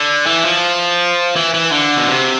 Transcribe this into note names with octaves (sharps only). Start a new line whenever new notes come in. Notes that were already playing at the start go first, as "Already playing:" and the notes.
Already playing: D3
E3
F3
E3
E3
D3
B2
C3